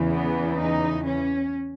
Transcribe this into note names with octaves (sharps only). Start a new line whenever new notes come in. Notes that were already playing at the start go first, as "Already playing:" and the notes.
Already playing: E2 C#3 E3
B3
D#4
C#4